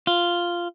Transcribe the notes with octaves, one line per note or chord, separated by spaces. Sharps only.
F4